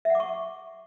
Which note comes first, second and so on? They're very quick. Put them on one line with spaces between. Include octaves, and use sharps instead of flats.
E5 F#5 D6 C#6